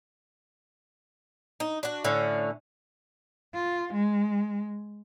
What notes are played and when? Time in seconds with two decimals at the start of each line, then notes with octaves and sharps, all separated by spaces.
1.60 D#4
1.83 D4 F#4
2.04 A2 D3 C#4
3.54 F4
3.94 G#3